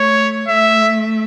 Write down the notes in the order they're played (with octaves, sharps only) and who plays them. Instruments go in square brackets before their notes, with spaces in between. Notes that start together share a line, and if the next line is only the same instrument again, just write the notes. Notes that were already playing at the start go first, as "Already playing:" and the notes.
Already playing: [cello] A3 [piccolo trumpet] C#5
[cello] A3 [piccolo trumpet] E5